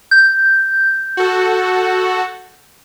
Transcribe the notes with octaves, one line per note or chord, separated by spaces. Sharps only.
G6
F#4 A4